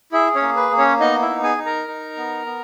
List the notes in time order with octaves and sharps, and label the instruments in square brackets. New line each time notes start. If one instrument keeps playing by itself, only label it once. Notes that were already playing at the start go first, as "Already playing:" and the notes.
[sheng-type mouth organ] E4 G#4 E5
C#4 C#5
A#3
B4
A#3
C#4 C#5
B3 D#4 D#5
E4 E5
D#4
G#4 G#5
D#4
A#4 A#5
D#4
B3
B3